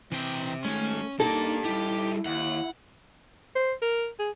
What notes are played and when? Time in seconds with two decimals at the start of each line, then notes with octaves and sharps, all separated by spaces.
0.12 C3 E3 G5
0.65 D#3 G#3 A3 C#4
1.20 A#3 D4 D#4 G4 A4
1.65 G3 D#4 E4 G4
2.26 D#2 F#5
3.55 C5
3.82 A#4
4.19 G#4